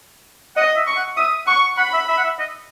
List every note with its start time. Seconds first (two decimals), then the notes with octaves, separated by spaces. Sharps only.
0.56 D#5 F#5
0.76 E5
0.86 C#6
0.97 F#5
1.17 E5 D#6
1.47 F#5 C#6
1.78 F#5 B5
1.93 E5
2.08 E5
2.18 F#5
2.24 E5
2.39 D#5